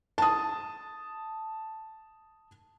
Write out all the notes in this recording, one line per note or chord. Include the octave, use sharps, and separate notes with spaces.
A5 D#6